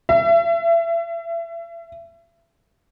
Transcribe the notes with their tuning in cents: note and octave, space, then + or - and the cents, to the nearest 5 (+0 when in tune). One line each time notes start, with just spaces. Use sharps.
E5 +30